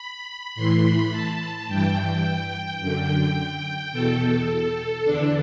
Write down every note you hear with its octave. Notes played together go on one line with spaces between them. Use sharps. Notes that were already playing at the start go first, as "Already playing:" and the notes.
Already playing: B5
A2 E3 C6
B5
A5
G2 E3 G5
F#2 D3 G5
E2 B2 A4
E2 D3 D4